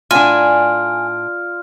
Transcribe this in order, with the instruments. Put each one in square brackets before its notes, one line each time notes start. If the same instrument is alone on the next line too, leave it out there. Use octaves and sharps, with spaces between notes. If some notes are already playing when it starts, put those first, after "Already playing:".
[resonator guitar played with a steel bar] A2 D4 [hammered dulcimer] F4 D5 [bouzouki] G#5 [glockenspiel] F6